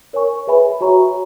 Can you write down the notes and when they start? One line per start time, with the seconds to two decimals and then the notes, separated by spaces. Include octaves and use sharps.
0.13 A#4 C#5 G#5 C#6
0.47 G#4 B4 E5 G#5 B5
0.81 F#4 C#5 E5 A#5 C#6